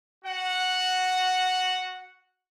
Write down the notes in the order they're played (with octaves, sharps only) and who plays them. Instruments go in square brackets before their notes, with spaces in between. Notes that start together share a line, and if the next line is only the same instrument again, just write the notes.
[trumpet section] F#4 F#5